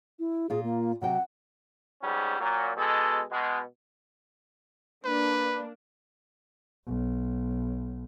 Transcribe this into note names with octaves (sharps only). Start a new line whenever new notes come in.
E4
A#2 F4 G#4
A#3
C3 F#3 F#5 G5
G#2 G3 B3 C#4
A#2 F#3
B2 G#3 A4
B2 G#3
A#3 D4 B4
B1